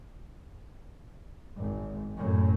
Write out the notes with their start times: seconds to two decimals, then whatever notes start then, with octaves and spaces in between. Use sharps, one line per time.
1.56 G#1
2.16 F#2 A2